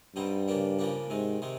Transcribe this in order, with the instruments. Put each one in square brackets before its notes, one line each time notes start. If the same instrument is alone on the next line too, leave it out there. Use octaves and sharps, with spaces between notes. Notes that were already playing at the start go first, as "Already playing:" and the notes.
[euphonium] G2 [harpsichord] B2 G3 C4 D#4
[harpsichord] C#3 F3 A#3 D4
C#3 F3 A#3 D4
[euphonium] G#2 [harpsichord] C3 D#3 G#3
[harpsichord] C3 D#3 G#3